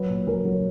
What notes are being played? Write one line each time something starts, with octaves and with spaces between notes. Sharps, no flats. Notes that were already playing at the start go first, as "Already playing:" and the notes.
Already playing: F#3 B4
A#2
F#3 A#4
F#3